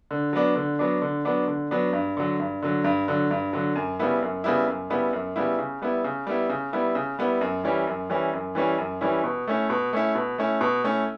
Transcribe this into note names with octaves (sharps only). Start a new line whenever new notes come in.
D3
F#3 B3 D4
D3
F#3 B3 D4
D3
F#3 B3 D4
D3
F#3 B3 D4
G2
D3 F#3
G2
D3 F#3
G2
D3 F#3
G2
D3 F#3
F#2
C#3 G3 B3 E4
F#2
C#3 G3 B3 E4
F#2
C#3 G3 B3 E4
F#2
C#3 G3 B3 E4
C#3
G3 B3 E4
C#3
G3 B3 E4
C#3
G3 B3 E4
C#3
G3 B3 E4
F#2
E3 G3 C#4 E4
F#2
E3 G3 C#4 E4
F#2
E3 G3 C#4 E4
F#2
E3 G3 C#4 E4
B2
A3 C#4 E4
B2
A3 C#4 E4
B2
A3 C#4 E4
B2
A3 C#4 E4